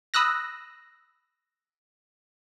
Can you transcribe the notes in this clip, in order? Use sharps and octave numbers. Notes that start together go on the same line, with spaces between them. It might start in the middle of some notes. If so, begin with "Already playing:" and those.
B5 D#6 E6 F#6 A#6